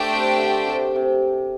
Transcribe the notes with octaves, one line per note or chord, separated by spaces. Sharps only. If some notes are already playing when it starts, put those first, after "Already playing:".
Already playing: A3 D4 G4 C5 G5
C3
D3
C3
C3